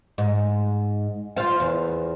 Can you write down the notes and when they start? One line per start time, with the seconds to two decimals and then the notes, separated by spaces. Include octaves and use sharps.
0.18 G#2
1.36 F4 C5 F5
1.60 E2